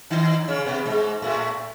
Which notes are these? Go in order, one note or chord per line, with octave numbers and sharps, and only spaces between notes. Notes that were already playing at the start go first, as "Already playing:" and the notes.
D#3 D#4
C#3 C#4
B2 B3
G#2 G#3
A2 A3